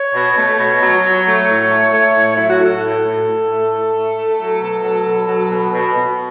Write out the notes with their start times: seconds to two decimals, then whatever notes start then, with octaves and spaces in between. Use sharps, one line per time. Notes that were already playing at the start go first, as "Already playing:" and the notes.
Already playing: C#5
0.14 B2
0.36 A3
0.59 B2
0.81 F#3
1.04 F#3
1.26 A3
1.48 A2
1.70 A3
1.93 A3
2.15 A2
2.36 F#3 E4
2.49 F#4
2.60 A2 A4
2.82 A2
3.04 A2
3.27 A2
3.49 A3
3.72 A2
3.94 A3
4.16 A3
4.39 F#3
4.61 B2
4.83 F#3
5.05 B2
5.28 F#3
5.50 B2
5.73 B2
5.95 B2